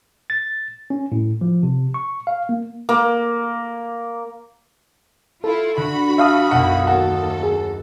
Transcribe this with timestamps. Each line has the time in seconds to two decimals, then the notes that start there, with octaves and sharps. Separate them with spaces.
0.30 A6
0.90 C#4
1.12 A2
1.41 F3
1.63 C3
1.94 C#6
2.27 F5
2.49 A#3
2.89 A#3
5.44 E4 F4 A4
5.77 D3 F#4 B5
6.18 E5 F5 G5 A5 D#6
6.51 B1 F#2 B2 F#5
6.87 D#2 F#4 A4 A#4
7.43 G#4